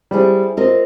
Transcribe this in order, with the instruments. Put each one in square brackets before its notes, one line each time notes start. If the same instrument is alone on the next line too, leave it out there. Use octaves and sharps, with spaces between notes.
[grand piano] G3 [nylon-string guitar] C4 E4 G#4
[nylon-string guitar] C4 F4 A#4 D#5